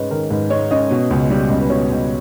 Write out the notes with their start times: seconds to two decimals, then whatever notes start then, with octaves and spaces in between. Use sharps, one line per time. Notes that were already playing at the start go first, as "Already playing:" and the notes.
Already playing: G#2 G#3 C#4 B4
0.11 D#3 A#4
0.30 G#2 B4
0.50 G#3 C#5
0.71 C#4 D#5
0.91 B2
1.10 C#2
1.30 G3
1.50 C#2
1.59 B4
1.70 B2 C#5
1.90 C#2